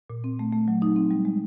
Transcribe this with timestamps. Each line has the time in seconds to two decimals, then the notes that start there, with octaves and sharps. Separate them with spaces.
0.10 A#2
0.24 C4
0.39 A3
0.53 A3
0.68 F#3
0.82 D#4
0.96 C4
1.11 G3
1.25 G#3